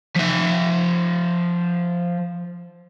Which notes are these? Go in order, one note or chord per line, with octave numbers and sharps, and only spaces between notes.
F3 E5